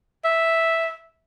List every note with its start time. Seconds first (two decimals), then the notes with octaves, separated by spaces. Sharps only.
0.24 E5